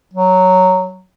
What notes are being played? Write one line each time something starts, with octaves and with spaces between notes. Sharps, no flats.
F#3